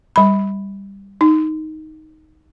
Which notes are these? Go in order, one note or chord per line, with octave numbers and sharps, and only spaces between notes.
G3 B5
D#4